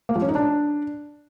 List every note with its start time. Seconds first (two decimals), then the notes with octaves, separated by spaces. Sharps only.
0.09 A#3
0.16 F3
0.22 C#4
0.29 D#4
0.35 D4